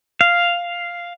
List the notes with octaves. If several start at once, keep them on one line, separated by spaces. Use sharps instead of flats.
F5